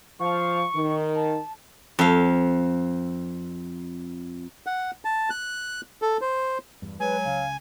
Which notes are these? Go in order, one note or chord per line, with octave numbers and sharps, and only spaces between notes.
F3 F5 C#6
D#3
A5
F2 F5
F#5
A5
F#6
A4
C5
E2 G2
F#3 G#3 B4 G#5
C#2 C#3 F5